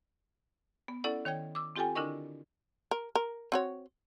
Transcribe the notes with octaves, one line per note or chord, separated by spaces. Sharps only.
B3
C#4 E4 A4 D5 F#5
D#3 C#5 G5 G#6
D6 E6
C4 F4 G4 A4 G5 G#5
D3 D4 E4 A#4 D#5 C#6
A#4
A#4
C4 F#4 C#5